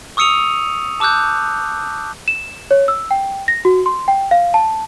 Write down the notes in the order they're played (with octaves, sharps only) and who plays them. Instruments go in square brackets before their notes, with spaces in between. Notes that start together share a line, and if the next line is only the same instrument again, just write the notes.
[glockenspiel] C#6 D#6 E6 C#7 D#7 F7
A5 D6 E6 F#6 G6
[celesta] E7
C#5
E6
G5
A#6
F#4
C6
G5
F5
A5